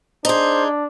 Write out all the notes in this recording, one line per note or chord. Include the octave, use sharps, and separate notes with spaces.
D4 D#4 G#4 C5